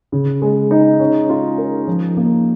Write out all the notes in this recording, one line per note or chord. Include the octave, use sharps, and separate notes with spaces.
C#3
G#3
D#4
C#4
F4
A#4
F3
A#3